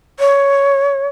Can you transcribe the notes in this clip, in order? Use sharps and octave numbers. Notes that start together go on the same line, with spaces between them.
C#5